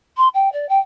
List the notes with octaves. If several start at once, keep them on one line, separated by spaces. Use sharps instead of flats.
C6
G5
D5
G5